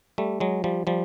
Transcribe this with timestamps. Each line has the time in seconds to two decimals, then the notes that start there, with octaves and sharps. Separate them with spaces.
0.18 G3 A3
0.40 F#3 G#3
0.64 F3 G3
0.87 F3 G3